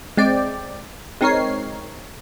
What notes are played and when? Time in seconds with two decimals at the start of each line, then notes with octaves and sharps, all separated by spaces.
0.17 G#3 C4 D5 G5
1.21 G#3 C4 D#4 A#4 C#5 C7